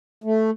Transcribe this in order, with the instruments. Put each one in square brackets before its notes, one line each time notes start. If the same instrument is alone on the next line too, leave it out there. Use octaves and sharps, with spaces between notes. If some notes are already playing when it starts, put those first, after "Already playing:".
[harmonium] A3